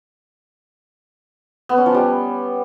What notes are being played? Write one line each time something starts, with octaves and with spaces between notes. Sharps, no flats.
B3
C#4
F3
G3